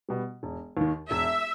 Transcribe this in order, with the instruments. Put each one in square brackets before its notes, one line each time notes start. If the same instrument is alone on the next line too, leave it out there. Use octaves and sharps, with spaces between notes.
[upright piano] B2 G3
E1
D#2 D#3
[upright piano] E1 [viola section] E5